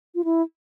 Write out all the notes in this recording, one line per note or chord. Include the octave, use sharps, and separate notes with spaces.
F4
E4